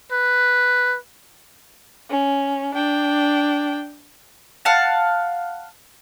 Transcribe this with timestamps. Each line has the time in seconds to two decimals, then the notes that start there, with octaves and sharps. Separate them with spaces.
0.12 B4
2.10 C#4
2.74 D4 G5
4.65 F5 F#5 A5